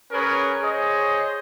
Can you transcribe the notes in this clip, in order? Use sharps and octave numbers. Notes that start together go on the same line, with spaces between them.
C#4 G#4 A#4 B4 C#5
G#4 C5 C#5 D#5